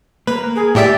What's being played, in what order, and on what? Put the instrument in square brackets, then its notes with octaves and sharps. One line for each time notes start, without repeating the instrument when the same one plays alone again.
[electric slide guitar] A#3 A#4 [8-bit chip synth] B4
[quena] G#4
[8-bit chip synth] A2 G4 E5 [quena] D5